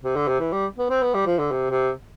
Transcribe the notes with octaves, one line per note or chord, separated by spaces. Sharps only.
C3
D3
C3
E3
G3
B3
C4
B3
G3
F3
D3
C3
C3